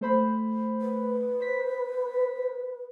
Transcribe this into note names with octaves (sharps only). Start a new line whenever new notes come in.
A3 C5 B5
B4
C5 B6